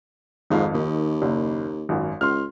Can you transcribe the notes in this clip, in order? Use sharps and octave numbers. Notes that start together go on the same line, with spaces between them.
G#1 F2 G#2 F5
D#2 D#3
F#1
G#1 F#2
C#2 C6 F6